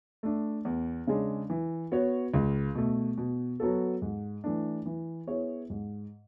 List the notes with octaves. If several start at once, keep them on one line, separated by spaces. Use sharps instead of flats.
A3 D4
E2
C#3 G#3 D4
E3
B3 F#4 C#5
C#2
B2 A3
B2
F#3 B3 F#4 A4
G#2
E3 A3 D4
E3
B3 E4 G#4 C#5
G#2